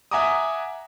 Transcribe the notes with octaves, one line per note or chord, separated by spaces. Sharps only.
E5 F#5 G#5 A#5 D6 D#6